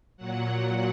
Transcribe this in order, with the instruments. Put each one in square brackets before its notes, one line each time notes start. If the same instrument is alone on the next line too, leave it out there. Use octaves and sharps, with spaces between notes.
[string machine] A#2 F#3 F#5